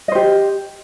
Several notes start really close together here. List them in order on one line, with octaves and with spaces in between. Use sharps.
D#5 C5 G4